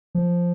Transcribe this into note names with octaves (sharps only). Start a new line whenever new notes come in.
F3